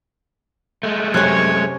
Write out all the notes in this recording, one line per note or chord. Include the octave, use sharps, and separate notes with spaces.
G#3 A3
F#2 C3 C#4 C#5 F#6